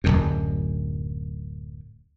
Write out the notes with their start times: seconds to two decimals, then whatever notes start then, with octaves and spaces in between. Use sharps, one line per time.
0.04 D1 G#1 F#2